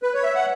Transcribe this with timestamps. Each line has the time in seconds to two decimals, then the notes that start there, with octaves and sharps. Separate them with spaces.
0.03 B4
0.14 C#5
0.23 E5
0.35 F#5